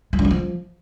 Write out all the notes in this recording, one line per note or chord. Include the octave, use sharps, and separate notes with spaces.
G#3
D4
G3
F3